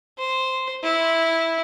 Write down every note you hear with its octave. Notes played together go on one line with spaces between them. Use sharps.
C5
E4